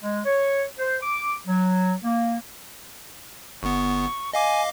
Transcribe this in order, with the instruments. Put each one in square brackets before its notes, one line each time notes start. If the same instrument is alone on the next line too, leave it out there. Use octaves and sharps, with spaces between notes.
[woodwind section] G#3
C#5
C5
D6
F#3
A#3
[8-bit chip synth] G1 B3 [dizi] C#6
[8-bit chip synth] D#5 F5 D6 [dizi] G#5